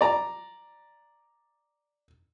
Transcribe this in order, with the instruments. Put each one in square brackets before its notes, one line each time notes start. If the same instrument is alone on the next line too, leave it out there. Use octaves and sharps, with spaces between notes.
[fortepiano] D5 A#5